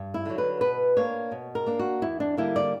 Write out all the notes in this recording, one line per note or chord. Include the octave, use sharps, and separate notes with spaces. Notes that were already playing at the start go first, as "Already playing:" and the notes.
Already playing: G2
E4
D3 F#3
B4
B2 B4
A#3 D4 C#5
B2
A#4
A#3 D4
F#4
E2 E4
D4
D3 G3 A#3 E4
D5